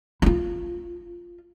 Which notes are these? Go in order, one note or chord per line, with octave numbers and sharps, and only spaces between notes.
E4 F4